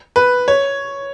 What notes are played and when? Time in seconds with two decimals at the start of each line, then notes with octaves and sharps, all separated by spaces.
0.16 B4
0.48 C#5